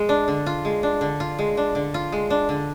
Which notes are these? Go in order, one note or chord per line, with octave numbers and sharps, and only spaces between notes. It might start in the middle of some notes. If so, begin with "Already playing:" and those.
Already playing: G#3
D4
D3
F4
G#3
D4
D3
F4
G#3
D4
D3
F4
G#3
D4
D3